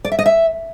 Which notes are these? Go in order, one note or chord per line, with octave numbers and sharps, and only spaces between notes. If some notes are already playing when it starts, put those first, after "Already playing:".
D5
E5
D#5
E5